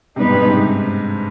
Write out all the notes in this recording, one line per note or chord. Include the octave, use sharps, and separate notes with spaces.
C3 G3 B3 D#4 B4
G#2
G2
G#2
C3